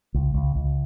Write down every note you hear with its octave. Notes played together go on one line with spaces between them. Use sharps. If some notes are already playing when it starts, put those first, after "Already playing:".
C#2
C#2
C#2